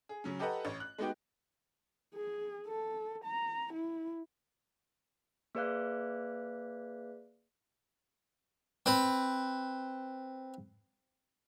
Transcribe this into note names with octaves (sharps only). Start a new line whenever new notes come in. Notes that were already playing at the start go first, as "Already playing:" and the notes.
G#4
C#3 F#3 C#4
G4 A4 B4 D#5 F#5 A#5
A1 C#5
F#6
G#3 B3 D#4 F#4 G4 G5
G#4
A4
A#5
E4
A#3 G#4 B4 D5 F5 F#6
C4 B4